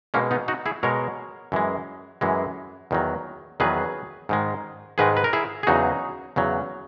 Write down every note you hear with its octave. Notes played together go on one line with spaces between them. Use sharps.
B2 G#3 A#3 C#4
B3 D#4
D#4 F#4
E4 G#4
B2 G#3 A#4 C#5
F#2 E3 G#3
F#2 E3 G#3
E2 D#3 F#3
E2 D#3 F#3 G#4 B4
G#2 D#3 G#3
G#2 D#3 G#3 G#4 B4
B4
A#4
E4 G#4
G#4
E2 C#3 F#3 D#4 F#4
E2 C#3 F#3